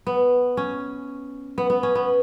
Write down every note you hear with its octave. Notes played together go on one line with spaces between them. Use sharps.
B3
C#4
B3
B3
C#4
B3